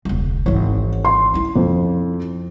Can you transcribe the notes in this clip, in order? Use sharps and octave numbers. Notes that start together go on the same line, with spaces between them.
E1 C#2
G#1 E3 C#5
C6
C#4 E4
F2